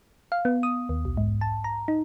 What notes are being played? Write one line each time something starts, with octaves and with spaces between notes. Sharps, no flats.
F5
B3
D#6
D#2
B1
G#2
A5
A#5
D#4